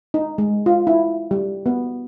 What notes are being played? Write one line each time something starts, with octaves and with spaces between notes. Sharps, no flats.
D#4
G#3
F4
E4
G3
B3